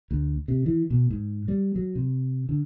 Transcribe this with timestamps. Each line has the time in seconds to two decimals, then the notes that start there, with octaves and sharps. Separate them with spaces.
0.11 D2
0.48 C3
0.66 E3
0.90 B2
1.10 G#2
1.48 G3
1.76 F#3
1.95 C3
2.49 D3